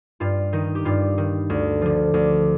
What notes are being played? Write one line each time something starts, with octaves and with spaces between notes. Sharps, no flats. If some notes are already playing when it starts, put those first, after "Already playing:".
G2 F4
D#3 D#4
G4
G2 F4
D#3
D2
D3 F3
D2